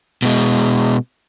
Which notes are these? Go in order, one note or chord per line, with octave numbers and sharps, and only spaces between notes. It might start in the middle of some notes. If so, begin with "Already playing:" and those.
B2 G#3